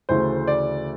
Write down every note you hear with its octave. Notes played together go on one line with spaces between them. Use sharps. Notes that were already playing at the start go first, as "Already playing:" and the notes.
D2 C#3 E3 A3 C5
D5